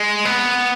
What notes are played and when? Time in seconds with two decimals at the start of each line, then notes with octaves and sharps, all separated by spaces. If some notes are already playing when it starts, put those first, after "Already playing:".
Already playing: G#3
0.25 B3